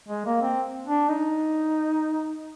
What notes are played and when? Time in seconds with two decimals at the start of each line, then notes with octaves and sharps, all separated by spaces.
0.08 G#3
0.26 A#3
0.42 C4
0.87 D4
1.09 D#4